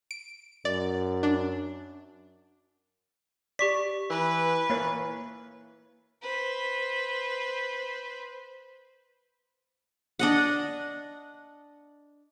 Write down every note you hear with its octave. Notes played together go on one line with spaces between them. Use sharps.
D7
F#2 D5
D4
G4 D5 C#6 B6
E3 B4
E3 A#3 C#5
B4 C5
D4 D#5 F#5